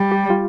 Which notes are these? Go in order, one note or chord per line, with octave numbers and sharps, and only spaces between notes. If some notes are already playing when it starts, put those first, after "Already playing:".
Already playing: G3
G4
F4